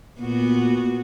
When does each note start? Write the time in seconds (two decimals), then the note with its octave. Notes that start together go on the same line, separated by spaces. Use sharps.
0.20 A#2 B3 F#4